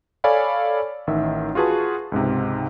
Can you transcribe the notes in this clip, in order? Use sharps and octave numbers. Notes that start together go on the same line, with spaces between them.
A4 C#5 D5 F5 G#5 B5
A1 D#3 E5
F4 F#4 G#4 B4 A5
C#2 G#2 C3